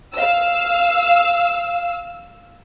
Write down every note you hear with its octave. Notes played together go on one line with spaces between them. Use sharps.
F5 E6